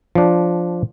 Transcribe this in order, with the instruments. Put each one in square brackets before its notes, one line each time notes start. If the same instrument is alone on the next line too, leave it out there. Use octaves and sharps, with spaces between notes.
[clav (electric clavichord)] F3 D4